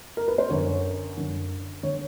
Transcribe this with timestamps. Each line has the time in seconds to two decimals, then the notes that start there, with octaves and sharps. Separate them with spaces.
0.17 A#4
0.28 B4
0.38 C5
0.49 F#2 D3 C#5
1.17 F#2 D3
1.83 D3 C#5